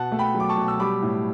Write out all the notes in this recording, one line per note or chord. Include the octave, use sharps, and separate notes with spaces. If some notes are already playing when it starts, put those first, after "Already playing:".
Already playing: B2 F#5 A5
A3
G5 B5
F#3
D6
A5 C#6
B2
E6
G3 B5 D6
A2